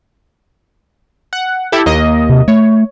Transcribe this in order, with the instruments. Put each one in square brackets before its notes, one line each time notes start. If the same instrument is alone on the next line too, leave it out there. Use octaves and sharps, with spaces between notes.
[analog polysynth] F#5
E4 G4 A4
D#2 A#3 D#5
[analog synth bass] C3
[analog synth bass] A3 [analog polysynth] C#5